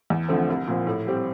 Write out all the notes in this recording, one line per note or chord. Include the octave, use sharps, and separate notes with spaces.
E2
D3 F3 A3 C4
C2
A#2 F3 C4
A2
G3 C4 G4